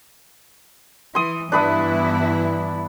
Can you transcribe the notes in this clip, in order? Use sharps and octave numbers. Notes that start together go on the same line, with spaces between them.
E3 C6 D#6
G2 E3 B3 D4 E4 B4 D#6